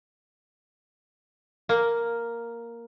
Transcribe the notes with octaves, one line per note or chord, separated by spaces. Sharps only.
A#3